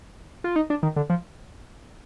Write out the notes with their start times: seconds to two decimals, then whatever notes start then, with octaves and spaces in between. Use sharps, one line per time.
0.44 F4
0.56 D#4
0.70 D4
0.83 D#3
0.96 D3
1.10 F3